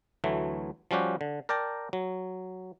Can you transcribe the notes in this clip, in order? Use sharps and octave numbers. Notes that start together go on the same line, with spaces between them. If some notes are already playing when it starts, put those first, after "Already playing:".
D2 E3 F#3 A3
F3 G3 C#4 F#4 G4
D3
A#4 D5 G5 A5 A#5
F#3